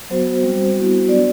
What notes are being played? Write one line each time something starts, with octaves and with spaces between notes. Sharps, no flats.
F#3 B3 F#4 C5
G3 C4 F#4
G3 B3 E4 F#4
F#3 B3 D4 F#4 D5